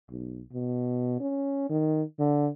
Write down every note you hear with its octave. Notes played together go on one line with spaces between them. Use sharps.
B1
B2
C#4
D#3
D3